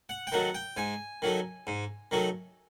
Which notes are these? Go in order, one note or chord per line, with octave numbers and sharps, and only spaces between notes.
F#5
G5
D#3 F#3 A3 F#5
G5
G#2 G#5
D#3 F#3 A3
G#2
D#3 F#3 A3